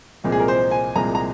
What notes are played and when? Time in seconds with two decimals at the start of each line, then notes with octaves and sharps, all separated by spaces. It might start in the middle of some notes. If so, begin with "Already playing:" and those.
0.24 C2 A#2 F3 G#3 C4
0.32 G#4
0.40 A#4
0.48 C5
0.71 G#5
0.95 C2 A#2 F3 G#3 C4 A#5
1.15 A#5